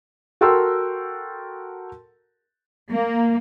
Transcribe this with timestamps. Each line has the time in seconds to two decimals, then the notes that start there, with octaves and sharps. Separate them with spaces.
0.41 F#4 A4 A#4 G5 C6 E6
2.91 A#3